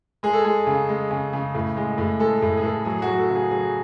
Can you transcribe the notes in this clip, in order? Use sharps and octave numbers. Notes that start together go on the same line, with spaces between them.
G#3 G#4
A4
G#3 G#4
C#3
G#3
C#3
C#3
A2
G#3
A2
G#3 A4
A2
G#4
A2 A4
F#3 G#4
F#4
F#3
A4
C#3
G#4
F#3 G#4